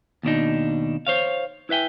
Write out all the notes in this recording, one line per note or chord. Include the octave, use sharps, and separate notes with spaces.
D#2 B2 D4 D#4
C5 C#5 F5
E4 B4 E5 G5 G#5